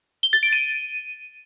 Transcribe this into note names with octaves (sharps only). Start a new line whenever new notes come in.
G7
A6
D7
D#7